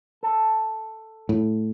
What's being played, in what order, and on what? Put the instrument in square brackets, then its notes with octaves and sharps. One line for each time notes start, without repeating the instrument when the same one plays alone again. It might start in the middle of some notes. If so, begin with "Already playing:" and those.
[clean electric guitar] A4
[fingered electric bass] A2